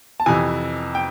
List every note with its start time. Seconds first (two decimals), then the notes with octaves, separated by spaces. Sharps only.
0.20 A5
0.26 F2 C3 E3 G#5
0.95 G5